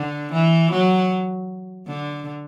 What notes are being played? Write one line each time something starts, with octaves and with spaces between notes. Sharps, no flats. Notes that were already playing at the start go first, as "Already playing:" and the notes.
Already playing: D3
E3
F#3
D3